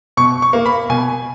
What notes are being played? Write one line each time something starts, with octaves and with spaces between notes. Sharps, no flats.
B2 C#6
C#6
A#3
B5
B2 G#5